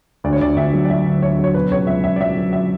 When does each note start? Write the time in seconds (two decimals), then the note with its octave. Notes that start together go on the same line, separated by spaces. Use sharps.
0.24 D2 D5
0.33 C#5
0.41 D2 D5
0.56 D2 E5
0.73 F#3
0.85 D5
0.89 F#3 E5
1.06 D3
1.22 D2 C#5
1.39 F#3
1.44 C#5
1.54 B2 B4
1.71 C#2 C#5
1.87 F#3 E5
2.04 C#2 E5
2.16 D5
2.20 F#3 E5
2.37 F#3
2.53 E5